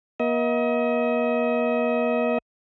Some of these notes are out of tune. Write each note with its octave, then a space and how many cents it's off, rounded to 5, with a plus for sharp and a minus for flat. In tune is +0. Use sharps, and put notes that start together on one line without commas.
A#3 +45 D#5 +35